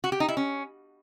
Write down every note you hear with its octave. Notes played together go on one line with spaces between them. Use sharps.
F#4
G4
D#4
E4
C#4